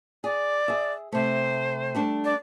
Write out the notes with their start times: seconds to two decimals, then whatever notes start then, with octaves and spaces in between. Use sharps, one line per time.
0.24 G#4 D5
0.68 G#4 E5
1.12 C3 A3 C5
1.95 G3 A3 D4
2.24 D5